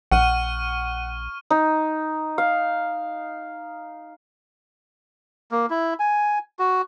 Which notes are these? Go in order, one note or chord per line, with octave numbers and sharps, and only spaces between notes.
A#1 F#5 C#6 F6 D#7
D#4
F5
A#3
E4
G#5
F#4